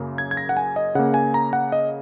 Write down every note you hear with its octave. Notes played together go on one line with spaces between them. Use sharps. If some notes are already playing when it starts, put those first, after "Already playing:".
Already playing: F#2 C#3 A#3
G#6
G#6
A#6
F#5
G#5
D#5
C#3 A#3 F#5
G#5
A#5
F#5
D#5